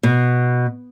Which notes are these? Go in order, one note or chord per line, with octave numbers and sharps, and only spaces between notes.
B2